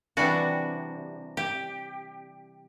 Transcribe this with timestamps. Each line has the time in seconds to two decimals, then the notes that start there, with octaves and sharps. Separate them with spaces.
0.17 C3 E3 G3 D4 F#4
1.37 G4